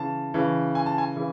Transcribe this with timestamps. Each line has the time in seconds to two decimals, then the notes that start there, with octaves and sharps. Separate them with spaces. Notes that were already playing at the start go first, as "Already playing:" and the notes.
Already playing: C#3 E3 A5
0.34 C#3 E3
0.75 G#5
0.86 A5
0.98 G#5
1.16 C#3 E3